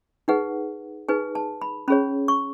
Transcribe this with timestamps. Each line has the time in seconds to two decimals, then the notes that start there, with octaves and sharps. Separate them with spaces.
0.28 D#4 G#4 B4 F#5
1.09 D#4 G#4 B4 G#5
1.35 A5
1.62 B5
1.88 C#4 G#4 C#5 B5
2.28 C#6